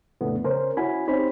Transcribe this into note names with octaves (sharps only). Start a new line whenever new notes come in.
F2 A2 C#3 A3 B3 D4
C#3 C#4 A#4 C5
C#4 E4 F#4 G#5 B5
C4 D#4 G4 C5 C#5 B5